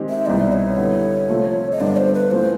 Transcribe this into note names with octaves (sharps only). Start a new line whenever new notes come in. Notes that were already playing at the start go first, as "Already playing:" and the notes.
Already playing: D#3 G#3 C4 D#4 G4
E5
C2 B2 G3 C4 D#4 D5
C#5
D3 G3 B3 E4
C3 F3 A3 C4 F4
D#5
G1 G2 D3 G3 D5
C5
B4
E3 A3 C#4 F4 C5